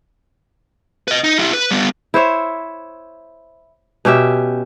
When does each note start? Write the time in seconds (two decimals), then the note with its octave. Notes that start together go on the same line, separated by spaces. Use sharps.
1.08 B4 D#5
1.24 D#4
1.39 E4 G4
1.53 B4
1.71 G3 B3
2.14 E4 C5 C#5 E5
4.05 B2 C#4 G4 E5